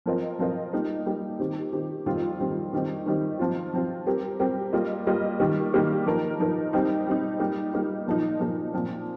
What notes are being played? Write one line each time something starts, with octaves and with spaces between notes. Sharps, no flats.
F3 C4 F4 A#4 D#5
F3 C4 F4 A#4 D#5
G3 A#3 D#4
G3 A#3 D#4
D#3 C4 G4
D#3 C4 G4
F2 D#3 G3 C4 F4
F2 D#3 G3 C4 F4
D#3 G3 C4 D#4
D#3 G3 C4 D#4
F3 C4 F4
F3 C4 F4
G3 C4 G4 A#4
G3 C4 G4 A#4
G3 A#3 F4 D#5
G3 A#3 F4 D#5
D#3 G3 A#3 G4
D#3 G3 A#3 G4
F3 D#4 A#4
F3 D#4 A#4
G3 C4 D#4
G3 C4 D#4
G3 A#3 D#4
G3 A#3 D#4
A#2 F3 A#3 D#4
A#2 F3 A#3 D#4
A#2 F3 C4